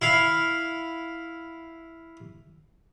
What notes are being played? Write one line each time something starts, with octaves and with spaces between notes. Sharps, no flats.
E4 F5